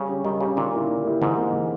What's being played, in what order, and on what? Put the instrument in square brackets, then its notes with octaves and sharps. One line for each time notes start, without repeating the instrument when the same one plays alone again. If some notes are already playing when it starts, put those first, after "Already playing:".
Already playing: [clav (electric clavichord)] C#3 [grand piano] G3
[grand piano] C#4 G4
[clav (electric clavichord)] D#3 [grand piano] G3
[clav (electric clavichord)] C#3 [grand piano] G4
[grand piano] C#4
[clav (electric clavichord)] A#2 [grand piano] D#3
[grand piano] A#3 E4 G4
D#3
A#3 E4 G4
[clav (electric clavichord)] G#2 [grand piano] E3
[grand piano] A#3 D#4 G4
E3